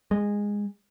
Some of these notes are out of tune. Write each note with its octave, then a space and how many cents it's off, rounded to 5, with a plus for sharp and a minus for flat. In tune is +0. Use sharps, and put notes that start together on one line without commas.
G#3 -15